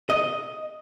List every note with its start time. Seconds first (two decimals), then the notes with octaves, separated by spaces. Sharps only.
0.10 D#5